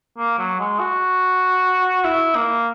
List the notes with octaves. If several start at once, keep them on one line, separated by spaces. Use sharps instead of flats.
A#3
F#3
G#3
F#4
E4
A#3